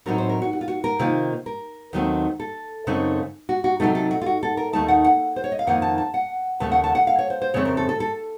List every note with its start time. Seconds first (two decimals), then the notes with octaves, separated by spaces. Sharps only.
0.06 A2 F#3 C4 D#4 A#4
0.18 C5
0.29 A#4
0.42 F#4
0.53 F#4
0.61 F4
0.68 F#4
0.84 A#4
0.99 C3 D#3 A#3 F4
1.46 A#4
1.93 D#2 D#3 F#3 A3 C4
2.40 A4
2.87 F#2 C#3 A3 C4 D#4
3.49 F#4
3.64 F#4
3.80 C3 F#3 A3 D#4 A4
3.95 A4
4.11 F#4
4.21 F4
4.26 F#4
4.43 A4
4.57 A#4
4.73 D#2 D#3 A3 D#4 A5
4.88 F#5
5.04 F#5
5.36 C5
5.44 C#5
5.52 D#5
5.59 F5
5.67 F2 D#3 A#3 D#4 F#5
5.82 A5
5.98 A5
6.14 F#5
6.60 D#2 C#3 A3 A5
6.72 F#5
6.84 A5
6.95 F#5
7.07 F5
7.19 C#5
7.30 C5
7.42 C5
7.54 F2 C#3 A3 C4 C#5
7.65 A#4
7.77 A4
7.89 A4
8.00 A4